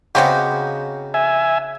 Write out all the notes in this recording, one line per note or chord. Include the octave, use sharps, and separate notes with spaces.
C#3 B3 C4 D#4 F#4 G4
E5 G#5